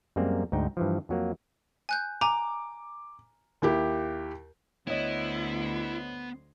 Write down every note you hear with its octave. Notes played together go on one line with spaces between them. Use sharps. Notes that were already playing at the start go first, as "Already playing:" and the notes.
F#2 G3 G#3 A#3 C4
D2 G#2 D#4 G5
G2 E3 F3
F2 F#3 A#3
G#5 F#6 G6
G#5 A#5 D6
D#2 E4 G4
D2 B3 E4 C5 C#5 D#5